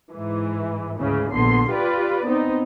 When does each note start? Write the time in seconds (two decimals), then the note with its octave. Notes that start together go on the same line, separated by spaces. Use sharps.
0.13 G#2 E3
0.99 D2 G#2 C#3 E3
1.32 A#1 D3 B3 C6
1.70 F4 G4 B4 D5
2.25 B3 C4 D#4